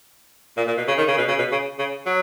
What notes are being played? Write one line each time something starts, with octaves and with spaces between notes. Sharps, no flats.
A#2
A#2
B2
C#3
D#3
C#3
B2
C#3
B2
C#3
C#3
F#3